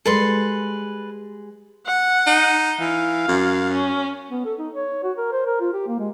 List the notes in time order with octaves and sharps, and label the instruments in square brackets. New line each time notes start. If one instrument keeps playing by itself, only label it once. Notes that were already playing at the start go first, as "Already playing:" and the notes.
[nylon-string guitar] G3 G#3 [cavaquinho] A4 B4 C6
[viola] F#5
[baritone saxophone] D#4
[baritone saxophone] E3 [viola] F5
[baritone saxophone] F#2
[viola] C#4
[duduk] B3
A4
D#4
C#5
F#4
A#4
C5
A#4
F4
G4
A#3
G#3